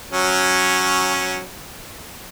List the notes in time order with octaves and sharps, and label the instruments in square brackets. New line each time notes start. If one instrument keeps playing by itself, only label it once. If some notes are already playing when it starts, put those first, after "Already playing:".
[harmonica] F#3 C#4